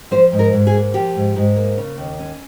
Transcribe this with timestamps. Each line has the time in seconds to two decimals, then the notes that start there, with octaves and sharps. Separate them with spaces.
0.11 F3 C5
0.32 G#2
0.39 A#4
0.53 G#2
0.67 G#4
0.74 A#3
0.94 F3 G4
1.15 G#2
1.36 G#2
1.56 A#3
1.78 C#3
1.97 D#2
2.19 C#4